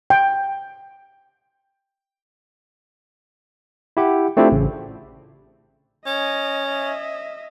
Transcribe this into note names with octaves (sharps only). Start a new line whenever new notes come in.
G5
E4 G4 F#5
A3 C4 D4 E4 F4 G4
A1 C#3
C#4 D#5
D#5 E5